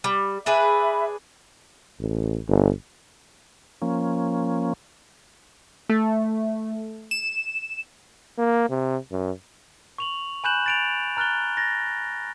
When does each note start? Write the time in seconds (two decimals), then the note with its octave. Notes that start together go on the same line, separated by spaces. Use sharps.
0.04 G3
0.46 D4 G#4 B4 E5 B5
2.00 A1
2.48 G1
3.82 F3 A#3 C#4
5.90 A3
7.11 E7
8.38 A#3
8.69 C3
9.12 F#2
9.98 C#6 F7 F#7
10.44 G#5 B5 F#6 G6 E7 F#7
10.66 A6 D7 F7
11.17 A#5 F6 F#6 A6 G7
11.57 A6 A#6